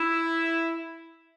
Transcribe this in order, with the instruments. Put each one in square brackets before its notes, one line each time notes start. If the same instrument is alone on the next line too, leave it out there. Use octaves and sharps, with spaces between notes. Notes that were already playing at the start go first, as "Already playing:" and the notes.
Already playing: [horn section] E4